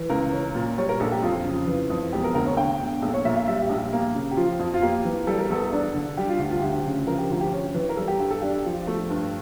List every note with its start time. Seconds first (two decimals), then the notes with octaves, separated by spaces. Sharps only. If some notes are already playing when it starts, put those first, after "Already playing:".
Already playing: E3
0.10 C#2 A#4
0.32 C#4
0.55 A#2
0.77 G3 C#5
0.89 A#4
1.00 A#1 A4
1.12 G4
1.22 F2 F4
1.45 C#3
1.67 E3
1.90 F2
2.12 E1 G4
2.24 A#4
2.34 D2 A#4
2.47 C#5
2.57 D3 G5
2.80 E1
3.02 A#1 A4
3.14 C#5
3.25 A#2 E5
3.36 F5
3.48 G3 E5
3.62 G4
3.69 A#1
3.78 G4
3.93 A#3
4.15 C#3
4.31 G4
4.37 F3 F4
4.59 F2
4.74 F4
4.82 A#3 G4
5.05 E3
5.27 G3 A4
5.39 A#4
5.50 E2 A4
5.72 D4
5.95 D3
6.17 G3 G4
6.29 F4
6.39 D2 G4
6.51 F4
6.62 D2 G4
6.85 C#3
7.07 F3 A#4
7.18 G4
7.30 D2 F4
7.41 G4
7.53 C#4
7.74 E3
7.89 A#4
7.97 G3 A4
8.08 G4
8.19 G2 G4
8.31 A4
8.41 D4 G4
8.65 F3
8.87 A3
9.10 G2